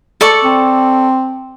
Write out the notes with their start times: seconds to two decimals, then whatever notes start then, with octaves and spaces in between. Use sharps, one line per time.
0.21 A4 D5 C#6
0.44 C4